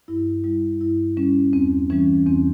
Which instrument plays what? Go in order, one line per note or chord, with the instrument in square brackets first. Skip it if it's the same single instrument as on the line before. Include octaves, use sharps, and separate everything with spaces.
[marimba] G2 E4
G3 E4
G2 E4
G3 C#4
E2 C4
E3 G3 C#4
E2 C4